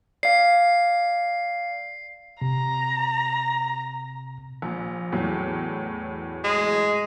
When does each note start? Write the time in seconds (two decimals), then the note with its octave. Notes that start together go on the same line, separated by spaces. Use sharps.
0.23 D5 F5 C7
2.42 C3 A#5
4.62 A#1
5.12 E2 A2 F#3
6.44 G#3